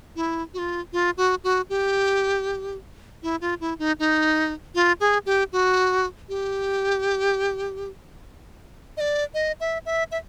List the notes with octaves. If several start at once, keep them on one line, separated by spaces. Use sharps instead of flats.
E4
F#4
F4
F4
F#4
F#4
G4
E4
F4
E4
D#4
D#4
F4
G#4
G4
F#4
G4
D#5
D5
D#5
E5
E5
E5